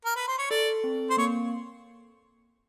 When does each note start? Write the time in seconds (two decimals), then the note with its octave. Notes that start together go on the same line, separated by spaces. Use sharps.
0.05 A#4
0.16 B4
0.28 C5
0.38 C#5
0.50 A4 D5
0.84 C4
1.10 C5
1.17 A#3 C#5